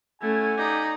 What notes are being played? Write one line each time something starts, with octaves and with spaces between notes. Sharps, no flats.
A3 C#4 E4 F#5 G#5
D#4 G4 D5